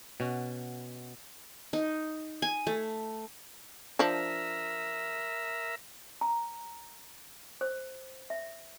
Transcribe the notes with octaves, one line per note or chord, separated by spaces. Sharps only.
B2 C#4 F#4
D#4
G#5
A3
F3 D4 A#4 E5
A#5
C5
E5